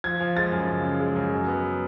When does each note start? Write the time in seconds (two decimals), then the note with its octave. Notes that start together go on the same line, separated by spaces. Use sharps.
0.04 F3 G#6
0.20 F3
0.37 G#3 A6
0.52 F#2
0.69 C#3
0.84 C#3
1.00 G#3
1.16 F#2
1.33 F#3
1.48 B3